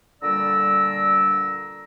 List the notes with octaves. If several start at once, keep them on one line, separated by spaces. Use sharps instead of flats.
A#2 D3 G3 D5 A#5 E6